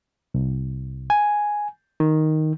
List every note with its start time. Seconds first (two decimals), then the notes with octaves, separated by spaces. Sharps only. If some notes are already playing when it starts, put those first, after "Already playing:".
0.34 C2
1.10 G#5
2.00 D#3